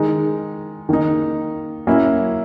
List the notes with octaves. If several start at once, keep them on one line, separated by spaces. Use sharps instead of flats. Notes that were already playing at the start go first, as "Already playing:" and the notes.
Already playing: D#3 G#3 D#4
D#3 A#3 D#4
F#3 A#3 C#4 E4